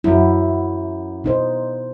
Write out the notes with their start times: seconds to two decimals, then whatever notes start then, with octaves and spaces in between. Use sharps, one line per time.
0.04 F#2 E4 F#4
1.24 B2 D#4 C5